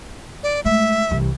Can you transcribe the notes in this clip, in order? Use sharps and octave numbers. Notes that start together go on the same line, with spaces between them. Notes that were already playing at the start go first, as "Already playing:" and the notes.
D5
G#3 A3 E5
C2 E3